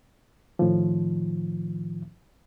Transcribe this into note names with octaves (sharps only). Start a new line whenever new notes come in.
A2 D#3 F3